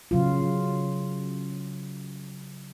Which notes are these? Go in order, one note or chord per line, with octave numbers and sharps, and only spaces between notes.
C#3 F#3 F4